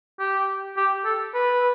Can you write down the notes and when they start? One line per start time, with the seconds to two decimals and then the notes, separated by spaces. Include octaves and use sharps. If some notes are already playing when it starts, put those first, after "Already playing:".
0.19 G4
0.77 G4
1.05 A4
1.34 B4